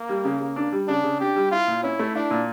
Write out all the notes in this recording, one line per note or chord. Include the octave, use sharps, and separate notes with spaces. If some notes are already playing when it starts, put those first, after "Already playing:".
Already playing: A#3
G3
C#3
C#3
D4
G3
C#3 D4
C#3
D4 G4
G3
E4 F4
A#2
C#4 E4
A3
D4 E4
A#2